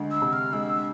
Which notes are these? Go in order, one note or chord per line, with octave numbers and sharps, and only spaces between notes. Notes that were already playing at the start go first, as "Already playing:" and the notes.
Already playing: D2 G#3
E6
C3
F6
G#3 E6